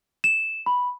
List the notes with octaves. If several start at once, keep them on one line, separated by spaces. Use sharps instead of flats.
E7
B5